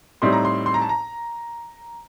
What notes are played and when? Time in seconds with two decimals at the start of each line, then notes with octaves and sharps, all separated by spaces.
0.22 A2 G3 C4 D#4 C6
0.32 A#5
0.45 C6
0.66 C6
0.74 A#5
0.81 A5
0.89 A#5